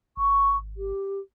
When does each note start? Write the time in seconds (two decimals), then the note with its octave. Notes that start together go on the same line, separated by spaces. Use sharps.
0.17 G#1 C#6
0.77 G4